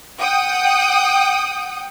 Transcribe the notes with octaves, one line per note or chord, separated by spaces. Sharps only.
F#5 G5 D#6